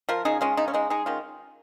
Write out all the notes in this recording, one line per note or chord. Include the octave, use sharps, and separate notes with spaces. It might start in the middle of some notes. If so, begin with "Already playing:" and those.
F3 F4 A#4
C#3 D#4 G#4
G#3 C#4 F4
C#3 D#4
C#4
G#3 D#4
G#3 D#4 G#4
D#3 C#4 F4